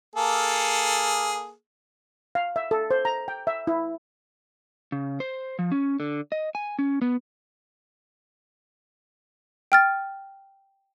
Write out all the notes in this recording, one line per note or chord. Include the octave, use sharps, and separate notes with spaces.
A#3 G#4 A4
F5
E5
A4
C5
A#5
G5
E5
E4
C#3
C5
F3
C#4
D3
D#5
G#5
C#4
B3
G5 F6 A6